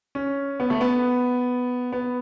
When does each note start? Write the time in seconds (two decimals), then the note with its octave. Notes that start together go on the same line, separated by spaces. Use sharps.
0.15 C#4
0.60 B3
0.70 A3
0.81 B3
1.92 B3